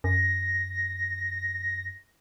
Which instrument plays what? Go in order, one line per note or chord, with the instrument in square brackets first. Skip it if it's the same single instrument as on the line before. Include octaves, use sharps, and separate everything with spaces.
[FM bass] F#2 [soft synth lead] A#6